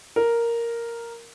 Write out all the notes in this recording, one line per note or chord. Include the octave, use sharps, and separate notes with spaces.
A#4